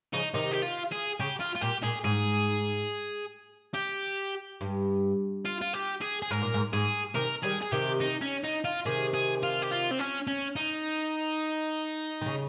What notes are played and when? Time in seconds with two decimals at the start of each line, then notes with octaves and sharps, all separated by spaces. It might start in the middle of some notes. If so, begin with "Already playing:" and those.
0.13 C#3 F3 D#4
0.34 C3 D#3 D#4
0.52 G4
0.62 F4
0.92 G#4
1.20 C#3 G4
1.40 F4
1.56 F4
1.62 A#2 G4
1.83 A#2 G#4
2.04 G#2 G#4
3.74 G4
4.61 G2
5.45 F4
5.61 F4
5.73 G4
6.01 G#4
6.22 G#4
6.31 G#2 A#4
6.42 A#2
6.54 G#2
6.73 G#2 G#4
7.15 C3 D#3 A#4
7.43 D#3 G3 G#4
7.62 G#4
7.72 C3 D#3 G4
8.01 D#4
8.21 C#4
8.44 D#4
8.65 F4
8.86 C3 D#3 G#4
9.14 G#4
9.43 F4
9.62 G4
9.71 F4
9.91 C4
9.99 C#4
10.27 C#4
10.56 D#4
12.21 D#3
12.26 C#3